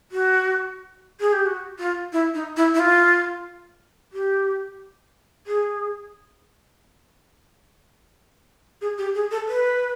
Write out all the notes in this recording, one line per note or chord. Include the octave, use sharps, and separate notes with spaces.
F#4
G#4
G4
F#4
F4
E4
D#4
E4
E4
F4
G4
G#4
G#4
G4
G#4
A4
B4